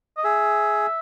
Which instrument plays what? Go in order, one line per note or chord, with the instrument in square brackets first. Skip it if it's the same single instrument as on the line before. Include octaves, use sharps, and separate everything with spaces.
[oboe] D#5
[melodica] G#4 [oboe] E5